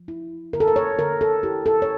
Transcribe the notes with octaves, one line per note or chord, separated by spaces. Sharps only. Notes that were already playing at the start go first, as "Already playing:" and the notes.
Already playing: F3
E4
D3 A#4
A4
A#4
C#5
D3 A#4
A4
E4 G4
A4
C#5